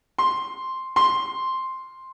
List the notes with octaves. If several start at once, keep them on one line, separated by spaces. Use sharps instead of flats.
C6
C6